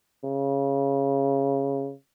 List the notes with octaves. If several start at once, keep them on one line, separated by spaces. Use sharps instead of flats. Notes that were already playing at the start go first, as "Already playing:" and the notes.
C#3